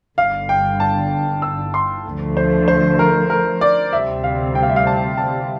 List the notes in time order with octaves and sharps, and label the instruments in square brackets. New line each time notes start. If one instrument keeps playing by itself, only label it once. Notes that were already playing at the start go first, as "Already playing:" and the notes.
[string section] G1 G2 D3 [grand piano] F5
[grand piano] G5
A5
E6
C6
[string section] D2 D3 F3 A3
[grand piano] C5
C5
A#4
A#4
D5
[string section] D2 C3 G3 C4 [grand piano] E5
[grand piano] F5
G5
F5
E5
F5
A5
A5